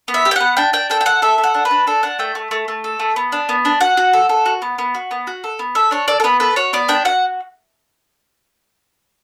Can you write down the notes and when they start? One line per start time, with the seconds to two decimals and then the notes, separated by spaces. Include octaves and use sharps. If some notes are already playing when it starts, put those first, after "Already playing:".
0.08 B3
0.14 E5
0.25 G4
0.31 G5
0.36 B3 F#5
0.57 D4 G5
0.73 D4 G5
0.90 A4 G5
1.01 G5
1.05 A4 F#5
1.22 A4 E5
1.38 A4
1.44 F#5
1.54 D4
1.65 B4
1.71 D4
1.87 D4 A4
2.03 D4 F#5
2.19 A3 G5
2.35 A3
2.51 A3
2.68 A3
2.84 A4
3.00 A3
3.16 B3
3.32 D4
3.49 B3
3.65 D4
3.81 F#4 F#5
3.97 F#4
4.13 A4
4.29 A4
4.46 F#4
4.62 B3
4.78 B3
4.95 F#4
5.11 B3
5.27 F#4
5.44 A4
5.59 B3
5.75 A4 E5
5.91 D4 C#5
6.08 A4 D5
6.20 A4
6.24 B3 B4
6.40 A4 B4
6.56 F#4 C#5
6.73 B3 D5
6.89 D4 G5
7.05 F#4 F#5